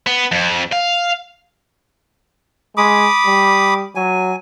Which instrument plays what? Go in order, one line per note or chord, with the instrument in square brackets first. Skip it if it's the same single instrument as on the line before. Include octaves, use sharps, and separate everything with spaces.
[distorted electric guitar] B3
F2
F5
[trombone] G#3 [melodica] B5 D6 D#6
[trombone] G3
[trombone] F#3 [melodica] G#5